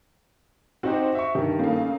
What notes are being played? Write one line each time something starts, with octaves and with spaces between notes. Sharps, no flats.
C4 D#4 F#4 G4 C5
E5 C#6
G2 D#3 G4
C#3 A3 A#3